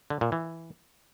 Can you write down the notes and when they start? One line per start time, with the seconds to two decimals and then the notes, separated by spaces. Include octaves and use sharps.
0.10 D3
0.21 A#2
0.32 E3